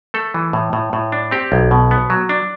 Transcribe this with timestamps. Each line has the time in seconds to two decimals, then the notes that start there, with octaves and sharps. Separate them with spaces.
0.14 A3 A4
0.34 E3
0.53 A2
0.73 A2
0.93 A2
1.12 D4
1.31 C4 G4
1.52 B1
1.71 B2
1.91 B3
2.10 F#3
2.29 D4